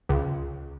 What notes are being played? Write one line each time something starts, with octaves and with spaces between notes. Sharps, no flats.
C#2